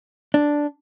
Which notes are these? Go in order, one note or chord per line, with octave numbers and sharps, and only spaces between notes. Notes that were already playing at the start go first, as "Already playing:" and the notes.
D4